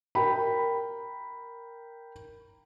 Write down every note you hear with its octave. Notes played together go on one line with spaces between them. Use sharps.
A#4 G5 B5